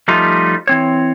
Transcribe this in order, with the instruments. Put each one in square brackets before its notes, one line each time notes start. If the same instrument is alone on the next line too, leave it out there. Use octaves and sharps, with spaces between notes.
[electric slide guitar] F3 G3 A3 D#4 F4
E3 C4 C#5